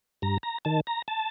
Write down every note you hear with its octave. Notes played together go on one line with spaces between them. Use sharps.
G2 A#5
A#5
D#3 A5
A#5
A5